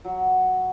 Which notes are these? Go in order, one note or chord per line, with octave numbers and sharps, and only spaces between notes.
F#3